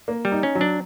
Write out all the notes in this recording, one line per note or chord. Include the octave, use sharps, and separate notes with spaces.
A#3
G3
D#4
C#4
F#3
D4